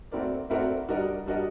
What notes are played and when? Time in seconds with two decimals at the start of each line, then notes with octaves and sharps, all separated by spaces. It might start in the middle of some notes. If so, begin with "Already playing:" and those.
0.12 A3 C4 F#4 A#4 D5
0.50 A3 C4 F#4 A#4 D5
0.89 G3 D4 F#4 A#4 D#5
1.26 G3 D4 F#4 A#4 D#5